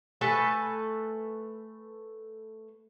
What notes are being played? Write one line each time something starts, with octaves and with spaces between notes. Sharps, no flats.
A3 A4 B4 G#5